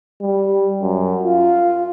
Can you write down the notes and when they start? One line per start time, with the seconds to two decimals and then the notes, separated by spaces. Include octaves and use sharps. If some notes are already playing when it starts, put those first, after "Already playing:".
0.21 G3
0.82 F#2
1.23 F4